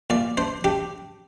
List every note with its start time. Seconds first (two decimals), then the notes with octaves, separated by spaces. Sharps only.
0.10 A#2 D5
0.37 D4 C5
0.64 D4 G4